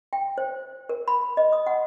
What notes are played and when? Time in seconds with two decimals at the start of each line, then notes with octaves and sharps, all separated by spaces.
0.13 G5
0.38 C5
0.89 A#4
1.08 B5
1.37 D#5
1.53 D#6
1.67 F#5